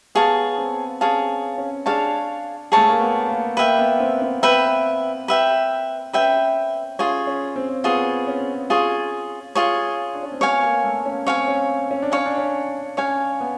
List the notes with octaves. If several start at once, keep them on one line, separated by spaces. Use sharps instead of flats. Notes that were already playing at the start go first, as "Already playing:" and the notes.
B3 G#4 C#5 F5 A5
C4
C#4 G#4 C#5 F5 A5
C#4
D4 G#4 C#5 F5 A5
A3 G#4 C#5 F5 A5
A#3
B3
A#3
A#3 B4 E5 G5
B3
C4
C4
B4 E5 G5
B4 E5 G5
C#4 B4 E5 G5
C#4 F4 G#4 C#5
C#4
C4
B3 F4 G#4 C#5
C#4
F4 G#4 C#5
F4 G#4 C#5
D4
C#4
C4
B3 C#5 F5 G#5
A#3
A3
C#4
C4 C#5 F5 G#5
C#4
C#4
D4
C#4 C#5 F5 G#5
D4
C#4
C#4 C#5 F5 G#5
B3